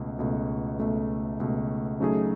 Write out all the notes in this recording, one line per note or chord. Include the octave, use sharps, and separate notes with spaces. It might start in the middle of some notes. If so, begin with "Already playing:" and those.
Already playing: C#2 B2 A3
C#2 B2 A3
C#2 B2 A3
C#2 B2 A3
C#3 F#3 A3 D#4 G#4